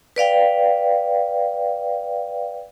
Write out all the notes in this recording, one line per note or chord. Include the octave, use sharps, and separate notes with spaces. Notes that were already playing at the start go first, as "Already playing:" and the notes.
B4 D5 F5 G5